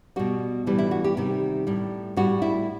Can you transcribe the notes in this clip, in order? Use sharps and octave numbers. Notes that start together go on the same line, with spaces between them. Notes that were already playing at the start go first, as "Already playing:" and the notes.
B2 G3 F#4
A2 E3 G3
E4
F#4
G4
C3 D#3 G3 G4
A2 G3
A2 G3 F#4
E4